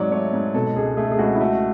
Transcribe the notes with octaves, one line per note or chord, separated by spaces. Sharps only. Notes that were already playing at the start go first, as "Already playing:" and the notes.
Already playing: G#2 F#3 C#5 D5
A3 C#5
G#2
B2 A4
C#2 G#4
A3 G#4
A4
G#4
C#2 F#4
E4
A3 F#4